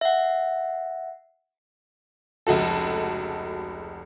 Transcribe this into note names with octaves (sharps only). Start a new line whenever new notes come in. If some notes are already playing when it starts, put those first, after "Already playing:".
E5 F#5
F1 C#2 F#4 A4